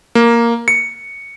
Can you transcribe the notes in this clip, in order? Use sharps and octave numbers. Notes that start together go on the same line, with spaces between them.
A#3
C#7